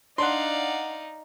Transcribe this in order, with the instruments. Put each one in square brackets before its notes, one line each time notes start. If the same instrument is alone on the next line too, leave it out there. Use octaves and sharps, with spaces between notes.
[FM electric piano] D4 F#5 [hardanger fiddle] D#4 [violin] D5 F5 [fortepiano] C6